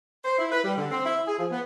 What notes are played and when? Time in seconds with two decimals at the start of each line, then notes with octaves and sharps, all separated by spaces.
0.25 C5
0.39 E4
0.52 B4
0.64 G3
0.78 D3
0.91 C4
1.06 E4
1.27 G#4
1.39 F3
1.52 B3